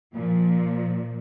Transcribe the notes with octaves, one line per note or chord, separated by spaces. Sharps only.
A#2 F3